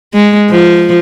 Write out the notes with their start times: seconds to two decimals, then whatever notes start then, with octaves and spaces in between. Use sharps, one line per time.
0.14 G#3
0.50 F3